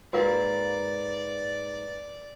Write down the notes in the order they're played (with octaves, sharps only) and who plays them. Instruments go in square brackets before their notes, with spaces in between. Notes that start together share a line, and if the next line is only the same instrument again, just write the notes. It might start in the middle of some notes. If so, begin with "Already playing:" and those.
[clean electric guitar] G#2 A#3 [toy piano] F#4 A#4 F5 [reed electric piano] B4 [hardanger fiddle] D5